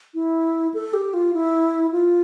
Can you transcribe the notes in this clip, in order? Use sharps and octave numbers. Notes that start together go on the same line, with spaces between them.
E4
A4
G4
F4
E4
F4